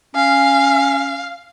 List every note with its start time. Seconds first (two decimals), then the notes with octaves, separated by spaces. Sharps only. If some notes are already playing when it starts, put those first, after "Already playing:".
0.15 C#4 F5